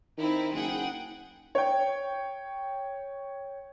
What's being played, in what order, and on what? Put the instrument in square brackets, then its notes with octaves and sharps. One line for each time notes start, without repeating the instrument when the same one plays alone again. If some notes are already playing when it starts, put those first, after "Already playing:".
[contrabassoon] D#3 [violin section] C4 D#4 E4
[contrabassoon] F#1 [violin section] G#4 F#5 G5
[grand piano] C#5 G5